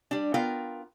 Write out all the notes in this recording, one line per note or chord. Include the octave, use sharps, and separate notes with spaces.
G3 D4
B3 F4 A#4 F5 G5